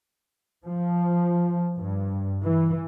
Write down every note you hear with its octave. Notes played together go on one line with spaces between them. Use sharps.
F3
G2
E3